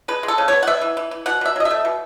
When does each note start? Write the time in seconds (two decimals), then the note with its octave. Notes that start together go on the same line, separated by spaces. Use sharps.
0.08 G#3 B4
0.23 G#3
0.28 A4
0.38 C#3
0.48 B3 C#5
0.63 F#5
0.67 B3 E5
0.81 E3
0.97 E3
1.11 E3
1.26 B2 F#5
1.41 B2 E5
1.56 F#3 D#5
1.65 E5
1.71 A3
1.85 B2